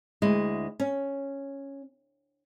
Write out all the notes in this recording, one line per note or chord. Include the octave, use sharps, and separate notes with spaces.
D2 G#3 E4 D#5
C#4